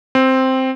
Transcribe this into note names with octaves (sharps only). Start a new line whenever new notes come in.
C4